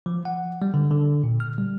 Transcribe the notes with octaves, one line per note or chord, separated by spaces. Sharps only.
F3
F#5
G3
D3
D3
A#2
F6
G3